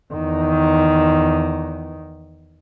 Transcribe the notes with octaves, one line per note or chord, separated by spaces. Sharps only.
E2 D#3